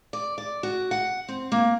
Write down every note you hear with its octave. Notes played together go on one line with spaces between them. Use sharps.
D5
D5
F#4
F#5
C4
A#3